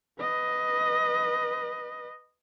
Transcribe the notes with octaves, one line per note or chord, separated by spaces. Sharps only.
B4 D#5